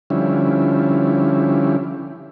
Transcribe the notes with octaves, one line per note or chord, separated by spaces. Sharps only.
D3 F3 G3 C#4 E4